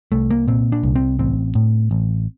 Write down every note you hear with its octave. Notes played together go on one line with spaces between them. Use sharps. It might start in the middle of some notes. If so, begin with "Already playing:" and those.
C2 A3
A#3
A#2 C4
D4
C2
C4
A1 C4
A2
A1